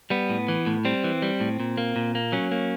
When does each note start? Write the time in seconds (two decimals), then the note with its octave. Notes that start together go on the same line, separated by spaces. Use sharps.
0.10 G3 B3
0.29 A2
0.48 E3
0.67 A2
0.85 G3 C4
1.04 E3
1.22 G3
1.40 A2
1.60 A#2
1.77 A#3
1.96 A#2
2.15 A#3
2.32 F#3 C#4
2.52 A#3